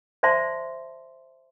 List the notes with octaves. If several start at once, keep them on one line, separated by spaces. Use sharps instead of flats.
C5 D5 E5 A5 C6